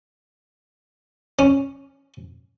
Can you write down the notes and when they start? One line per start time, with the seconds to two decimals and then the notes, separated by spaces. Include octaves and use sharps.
1.39 C#4